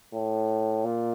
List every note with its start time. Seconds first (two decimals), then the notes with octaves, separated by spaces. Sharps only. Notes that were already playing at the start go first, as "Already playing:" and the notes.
0.13 A2
0.84 A#2